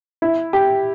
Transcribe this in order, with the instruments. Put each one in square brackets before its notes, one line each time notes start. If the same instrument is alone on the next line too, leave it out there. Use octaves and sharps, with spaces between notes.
[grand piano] E4
G4